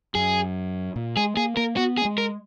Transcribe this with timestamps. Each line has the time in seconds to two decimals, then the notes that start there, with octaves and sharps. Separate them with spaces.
0.15 F#2 G#4
0.96 A#2
1.16 G#3 G#4
1.37 A#3 G#4
1.57 A#3 A#4
1.77 B3 F#4
1.98 G#4
2.05 G#3
2.18 A#4